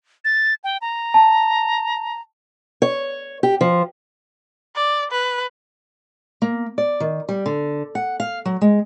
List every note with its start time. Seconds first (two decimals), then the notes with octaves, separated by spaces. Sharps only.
0.25 A6
0.64 G5
0.82 A#5
1.14 A5
2.82 C#5
3.43 G4
3.61 F3
4.76 D5
5.12 B4
6.42 A#3
6.78 D5
7.00 D#3
7.29 G3
7.46 D3
7.95 F#5
8.20 F5
8.45 F#3
8.61 G#3